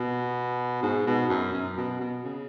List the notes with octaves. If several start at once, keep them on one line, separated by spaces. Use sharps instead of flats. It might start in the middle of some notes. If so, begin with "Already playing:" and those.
Already playing: B2
G#2
B2
F#2
F#2
B2
B2
C#3